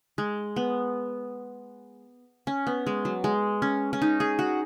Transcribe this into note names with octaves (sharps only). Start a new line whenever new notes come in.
G#3
B3
C#4
B3
G#3
F#3
G#3
C#4
C#4
D#4
G#4
F#4